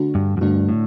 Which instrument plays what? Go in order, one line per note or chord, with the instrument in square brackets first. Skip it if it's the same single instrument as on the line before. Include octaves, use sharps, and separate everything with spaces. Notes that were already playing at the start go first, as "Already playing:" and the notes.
Already playing: [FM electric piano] D3 A3 D4 F#4
[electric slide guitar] G2
F#2
[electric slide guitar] G2 [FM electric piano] D3 A3 D4 F#4
[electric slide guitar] A2